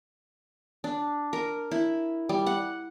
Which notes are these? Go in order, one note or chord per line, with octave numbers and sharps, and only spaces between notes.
D4
A#4
E4
G3
F#5